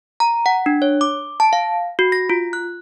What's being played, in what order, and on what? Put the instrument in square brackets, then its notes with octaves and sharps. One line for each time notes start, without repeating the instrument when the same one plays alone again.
[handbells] A#5
F#5
D4
C#5
D6
A5
F5
F#4
A#6
F4
F#6